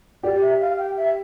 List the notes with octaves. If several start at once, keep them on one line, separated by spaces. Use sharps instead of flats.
G4 D5
E5
F5
G5
E5